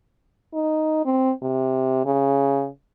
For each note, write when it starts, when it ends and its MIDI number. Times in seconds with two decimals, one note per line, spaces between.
0.54 1.05 63
1.05 1.31 60
1.42 2.03 48
2.05 2.67 49